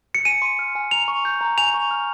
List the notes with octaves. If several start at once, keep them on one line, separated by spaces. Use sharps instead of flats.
C#7
G#5 D#7
C6
F6
G#5
A#5 F7
C#6
G6
A#5
G#5 F7
C#6
F6